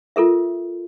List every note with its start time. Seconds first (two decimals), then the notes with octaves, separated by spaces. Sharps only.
0.16 F4 A4 A#4 E5